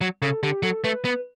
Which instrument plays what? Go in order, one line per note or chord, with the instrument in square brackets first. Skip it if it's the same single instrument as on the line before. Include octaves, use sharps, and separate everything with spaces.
[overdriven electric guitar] F#3
[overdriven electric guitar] C#3 [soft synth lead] A4
[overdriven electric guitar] D3 [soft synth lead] G4
[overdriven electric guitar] F#3 [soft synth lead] A4
[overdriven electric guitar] A3 [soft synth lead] B4
[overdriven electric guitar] B3